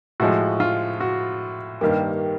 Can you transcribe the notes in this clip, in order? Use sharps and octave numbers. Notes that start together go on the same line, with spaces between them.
A2 F3 G#3 F#4
F4
F#4
G2 D#3 G3 A#3 G4